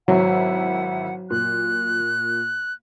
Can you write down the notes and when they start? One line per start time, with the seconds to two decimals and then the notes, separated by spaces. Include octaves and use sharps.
0.08 G#1 F#3 E4 F#5
1.30 A#2 F#6